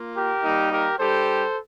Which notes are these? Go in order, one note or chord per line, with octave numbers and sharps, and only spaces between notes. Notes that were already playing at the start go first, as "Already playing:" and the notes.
Already playing: A#3 F4
G4 A#4
G3 A#3 D#4
G4 A#4
G3 D4 G4 A4 C5